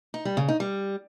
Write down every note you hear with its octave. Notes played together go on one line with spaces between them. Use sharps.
D#4
G3
C#3
D#4
G3